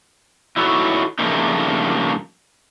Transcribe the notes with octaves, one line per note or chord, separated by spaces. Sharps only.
D#4 E4 F#4 A4 C#5
G2 C#3 F3 A3 A#3 D#4